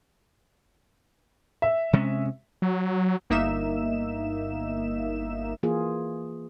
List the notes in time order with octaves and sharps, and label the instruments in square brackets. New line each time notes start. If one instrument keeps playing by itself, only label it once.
[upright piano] E5
[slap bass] C3 G#3 C#4
[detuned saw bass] F#3
[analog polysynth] G1 A#3 D#4 E5 E7
[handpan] E3 A#3 F4 G#4